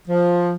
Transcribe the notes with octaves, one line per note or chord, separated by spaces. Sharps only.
F3